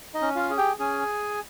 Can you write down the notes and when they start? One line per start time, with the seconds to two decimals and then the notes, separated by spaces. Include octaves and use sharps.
0.14 D#4 D#5
0.22 C#4
0.36 F4 F5
0.50 G#4
0.58 G4 G5
0.79 C#4 G#4 G#5